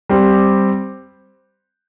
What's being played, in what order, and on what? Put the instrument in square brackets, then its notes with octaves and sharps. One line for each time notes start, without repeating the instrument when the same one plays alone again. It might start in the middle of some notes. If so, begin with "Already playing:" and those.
[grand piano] G3 C4 G4